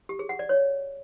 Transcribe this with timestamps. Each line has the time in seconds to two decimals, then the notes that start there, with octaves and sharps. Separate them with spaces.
0.09 G4
0.19 G#4
0.29 F#5
0.39 D5
0.49 C#5